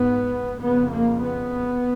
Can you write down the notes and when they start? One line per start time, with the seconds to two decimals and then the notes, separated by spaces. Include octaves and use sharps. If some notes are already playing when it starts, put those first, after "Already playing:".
Already playing: G#2 B3
0.62 F2 C#3 B3
0.92 A#3
1.21 B3